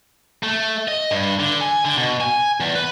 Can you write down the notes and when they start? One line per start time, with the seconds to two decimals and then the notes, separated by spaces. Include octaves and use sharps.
0.43 A3
0.88 D#5
1.11 G2
1.40 D3
1.61 G#5
1.85 D3
1.97 B2
2.21 G#5
2.60 E2
2.76 B4